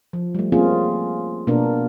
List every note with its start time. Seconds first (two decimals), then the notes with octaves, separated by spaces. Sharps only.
0.13 F3
0.35 G3 A3
0.52 A#3 C4 C#4 F4 G#4
1.47 B2 A#3 B3 D4 A#4